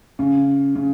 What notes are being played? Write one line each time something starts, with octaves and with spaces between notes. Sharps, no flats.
C#3
C#3